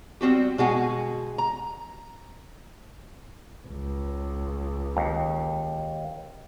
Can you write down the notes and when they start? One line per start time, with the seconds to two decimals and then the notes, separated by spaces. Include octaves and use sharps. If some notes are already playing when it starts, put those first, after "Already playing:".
0.21 G3 C4 F#4 G4
0.58 B2 G#3 F#4 G#5
1.38 A#5
3.67 C#2
4.97 D#2